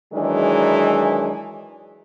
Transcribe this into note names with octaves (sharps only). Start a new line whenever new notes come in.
D#3 E3 F#3 G#3 D4 G#4